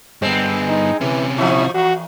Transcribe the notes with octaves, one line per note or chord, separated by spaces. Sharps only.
G2 G#3 B3 C4
D#4
C3 E3 C#4
A#2 F3 E4
E2 F#4